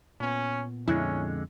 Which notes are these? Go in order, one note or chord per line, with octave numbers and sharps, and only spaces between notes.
A#2 B3 C#4
F2 D3 G#3 C#4 E4